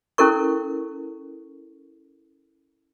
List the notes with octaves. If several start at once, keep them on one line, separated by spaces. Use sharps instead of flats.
C#4 E4 A4 A#4 C#6